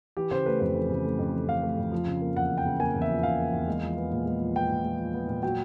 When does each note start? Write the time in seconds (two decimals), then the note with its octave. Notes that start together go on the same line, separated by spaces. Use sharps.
0.17 E3 G4
0.31 C#3 C5
0.46 A3 B4
0.60 F2 C5
0.75 E3
0.89 C#3
1.04 A3
1.19 F2
1.34 E3
1.48 C#3 F5
1.63 A3
1.78 F2
1.92 F3
2.07 C#3
2.21 A#3
2.36 E2 F#5
2.50 F3
2.58 G5
2.65 C#3
2.79 A#3 G#5
2.95 E2
3.02 E5
3.10 F3
3.23 C#3 F5
3.38 A#3
3.53 E2
3.68 G#3
3.82 F3
3.97 B3
4.12 A#2
4.26 G#3
4.41 F3
4.55 B3 G5
4.70 A#2
4.84 G#3
4.99 F3
5.14 B3
5.28 A#2
5.43 F#3 G5